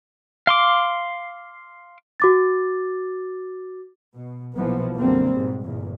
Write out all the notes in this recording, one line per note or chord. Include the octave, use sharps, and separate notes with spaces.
F5 C6 D6
F#4 D6 A6
B2
B1 A#2 E3 F3 B3
B1 F#2 D3 G3 A#3 C4
G#1 G#2 B2
G1 E2 A#2